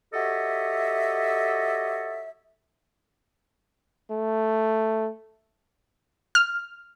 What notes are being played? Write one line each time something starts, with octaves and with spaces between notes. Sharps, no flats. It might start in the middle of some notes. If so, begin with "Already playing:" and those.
F#4 G4 A4 C#5 D#5 E5
A3
F6